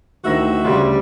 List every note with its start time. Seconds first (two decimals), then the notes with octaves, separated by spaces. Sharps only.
0.25 D2 D#3 E4 F#4 C5 E5 A#6
0.64 D2 C#3 G3 C6